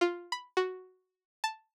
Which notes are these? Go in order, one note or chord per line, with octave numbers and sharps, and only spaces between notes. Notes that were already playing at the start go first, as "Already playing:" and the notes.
F4
B5
F#4
A5